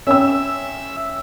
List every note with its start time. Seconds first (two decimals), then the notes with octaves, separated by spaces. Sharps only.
0.07 C#4 E5 G5 E6